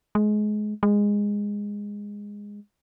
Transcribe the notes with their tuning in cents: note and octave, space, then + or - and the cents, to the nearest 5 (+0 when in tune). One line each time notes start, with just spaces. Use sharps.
G#3 +25
G#3 -15